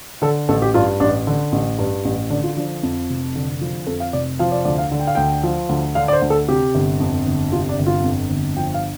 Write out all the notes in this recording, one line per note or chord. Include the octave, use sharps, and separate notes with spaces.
D3 A4
A1 A4
G4
G2 F4
A1 D4
D3
A1
G2
A1
D3 D4
F4
F3 D4
F2
F1
D3
F3
F2 A4
F5
F1 D5
F3 F5
D5
D2 D5
F5
D3
G5
F5
D2 G5
F3
D2
D3 F5
D5
C5
D2
A4
C3 G4
G1
F2
G1
C3 F4
D4
G1
F4
F2
G1
F3 G5
F5